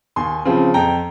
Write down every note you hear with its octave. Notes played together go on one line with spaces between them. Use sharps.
D#2 G#5 C6
C#3 F3 C4
F2 G5 A#5